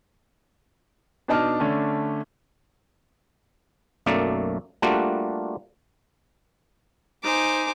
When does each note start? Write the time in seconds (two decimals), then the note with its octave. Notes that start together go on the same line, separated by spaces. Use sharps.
1.28 B2 D4 D#4 A5 D6 F6
1.60 D3 A3 C#4 D4
4.06 B1 F#2 A3 A#3 D5
4.82 G3 A3 A#3 D4 F4 F#4
7.23 D#4 C5 G#5 D6